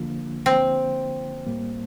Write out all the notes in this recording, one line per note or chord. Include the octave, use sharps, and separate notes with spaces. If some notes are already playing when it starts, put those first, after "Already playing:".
Already playing: D3 F3 A#3 D4 F4
C4
A2 G3 A#3